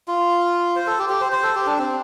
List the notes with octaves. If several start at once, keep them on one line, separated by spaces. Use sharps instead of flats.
F4
C5
A4
G4
G4
C5
C5
A4
G4
D4
C4